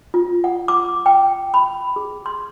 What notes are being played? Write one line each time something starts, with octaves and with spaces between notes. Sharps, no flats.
F4
F#5
D6
G5
B5
G#4
C6